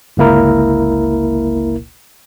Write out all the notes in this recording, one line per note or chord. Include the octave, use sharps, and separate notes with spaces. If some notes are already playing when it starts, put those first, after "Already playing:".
G1 C#2 A#3 E4 A#4